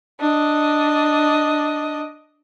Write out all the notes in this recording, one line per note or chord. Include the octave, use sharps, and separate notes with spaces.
D4 D#5